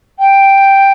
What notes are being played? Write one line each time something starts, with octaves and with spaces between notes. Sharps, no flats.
G5